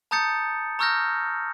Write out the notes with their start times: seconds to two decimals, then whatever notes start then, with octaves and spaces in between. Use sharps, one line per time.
0.11 A5 A#5 D#6 G6 A6 C#7
0.79 A#5 C#6 E6 F6 G6 A#6